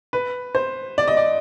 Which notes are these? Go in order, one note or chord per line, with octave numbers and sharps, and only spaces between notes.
B4
C5
D5
D#5
D5